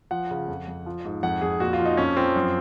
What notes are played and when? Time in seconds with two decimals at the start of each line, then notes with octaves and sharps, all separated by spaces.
0.11 F3 F#5
0.31 C#3
0.48 F2
0.68 F2
0.86 F3
1.05 G#2
1.23 F2 F#5
1.41 F2 G#4
1.60 A#2 F#4
1.73 F4
1.79 F3
1.85 D#4
1.97 F2 C#4
2.16 F3 C4
2.35 F#2